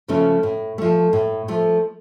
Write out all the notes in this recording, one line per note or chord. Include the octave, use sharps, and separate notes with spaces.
C#3 F3 A3 C#4
A2
F3 A3
A2
F3 A3